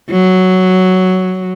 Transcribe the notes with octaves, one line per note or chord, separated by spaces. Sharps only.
F#3